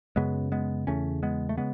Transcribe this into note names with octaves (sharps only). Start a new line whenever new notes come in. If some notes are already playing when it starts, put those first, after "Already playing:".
F#2 C#3 G#3 B3
G#3 B3
E2 C#3 A3 C#4
G#3 B3
A3
C#3 G#3 B3